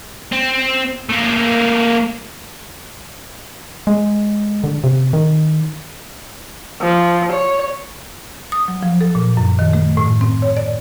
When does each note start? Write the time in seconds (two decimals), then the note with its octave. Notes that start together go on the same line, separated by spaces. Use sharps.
0.32 C4
1.09 A3 A#3
3.87 G#3
4.64 D3
4.84 C3
5.13 D#3
6.81 F3
7.33 C#5
8.52 D#6
8.68 F#3
8.83 F3
9.01 A4
9.15 A#2
9.37 F#2
9.59 D#3
9.73 A3
9.97 A2
10.21 C4
10.42 C#5
10.57 D5